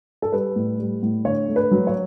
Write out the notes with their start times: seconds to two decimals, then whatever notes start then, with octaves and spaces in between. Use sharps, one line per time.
0.22 A4
0.32 G3 B4
0.56 A2
0.79 G3
1.03 A2
1.25 D3 C#5
1.48 A3
1.56 B4
1.71 F#3
1.87 C#5